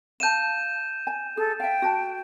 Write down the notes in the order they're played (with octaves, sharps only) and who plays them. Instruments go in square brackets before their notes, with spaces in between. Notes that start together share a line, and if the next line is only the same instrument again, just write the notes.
[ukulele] F5 A5 [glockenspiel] G6 D#7 E7
[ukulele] G#5
[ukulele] G#4 [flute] A4
[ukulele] E5 F5 [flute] G5
[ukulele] F#4 A5